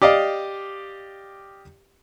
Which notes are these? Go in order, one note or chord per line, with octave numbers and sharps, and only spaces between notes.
G4 D5 D#5 F5